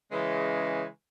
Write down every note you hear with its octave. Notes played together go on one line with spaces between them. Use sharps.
C#3 E3 G#3